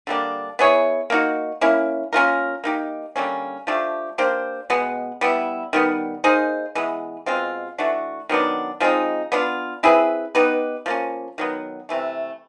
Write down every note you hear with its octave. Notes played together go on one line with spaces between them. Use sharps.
D3 G3 A#3 D4
B3 E4 G#4 C#5
A#3 D#4 F#4
A#3 C#4 E4
A#3 C#4 F4 A#4
A#3 D#4 G4
D3 G3 A#3 C#4
F3 A3 D4 G4
A#3 D4 G4 C5
B2 G#3 B3
G3 B3 E4
D#3 G3 B3
A#3 D#4 G#4 C5
E3 G#3 B3
B2 G#3 C4 F4
E3 A3 D4 F#4
D#3 F#3 B3 D4
F3 G#3 C4 D#4
B3 D4 F4
C4 E4 G#4 B4
B3 D#4 G4 B4
F3 A#3 C#4
D#3 F#3 B3
C3 E3 A3